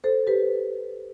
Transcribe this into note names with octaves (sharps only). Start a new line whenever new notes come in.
A4 C5
G4 B4